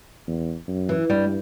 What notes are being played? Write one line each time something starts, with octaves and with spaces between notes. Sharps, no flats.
E2
F#2
E3
G2 G3